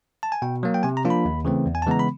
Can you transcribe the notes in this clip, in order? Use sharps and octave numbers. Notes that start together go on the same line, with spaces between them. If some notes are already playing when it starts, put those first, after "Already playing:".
A5
G#5
B2 G5
F#3 A#3
G5
C3 G#5
A#5
F3 A#3 D4 F4
B5
D#2
C#3 E3 A3 C4
E2
G#5
A5
C#3 E3 G#3 B3 A#5
B5